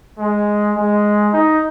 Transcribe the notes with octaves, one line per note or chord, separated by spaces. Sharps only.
G#3
G#3
D#4